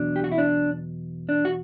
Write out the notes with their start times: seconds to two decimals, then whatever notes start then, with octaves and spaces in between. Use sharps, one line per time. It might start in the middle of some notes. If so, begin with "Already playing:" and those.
Already playing: E2 B2 F#3 D4
0.16 G4
0.24 F#4
0.32 E4
0.38 D4
1.29 D4
1.45 F#4